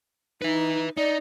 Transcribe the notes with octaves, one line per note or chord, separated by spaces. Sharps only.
D#4 B4 E5
D#4 D5